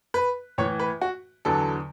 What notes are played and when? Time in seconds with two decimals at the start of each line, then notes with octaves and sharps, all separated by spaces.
0.14 B4
0.58 A2 E3 C#5
0.80 B4
1.02 F#4
1.45 E2 D3 F#3 A4